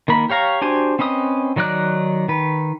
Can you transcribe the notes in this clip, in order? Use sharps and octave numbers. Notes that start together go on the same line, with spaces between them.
D#3 A#3 A#4 B5
G4 C#5 F5 A#5 C#6
D4 F#4 G4 C5 G#5
C4 C#4 B4 D#5 D#6
D#3 F#3 D#4 D5 F#6
D#3 B4